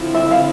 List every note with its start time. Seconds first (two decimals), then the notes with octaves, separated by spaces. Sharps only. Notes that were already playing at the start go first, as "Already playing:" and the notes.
Already playing: D3 F3 C4 E4
0.15 E5
0.31 F5